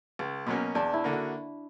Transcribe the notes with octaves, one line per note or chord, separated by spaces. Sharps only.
C#2
B2 F#3 A#3 C#4
E2 D4
E4
D3 A#3
F#4